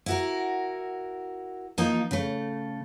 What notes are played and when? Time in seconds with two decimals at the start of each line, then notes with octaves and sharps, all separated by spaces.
0.06 E4 F#4 A#4
1.78 F3 A#3 D#4
2.11 C#3 A3